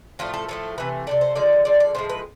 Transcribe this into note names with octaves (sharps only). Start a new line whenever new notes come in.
A2 F3 A3 F4
A4
A2 F3 A3 A4
C3 E3 A3 B4
C3 E3 A3 D5
C5
D3 F3 G#3 D5
D3 F3 G#3 D5
D5
A2 F3 G#3 C5
B4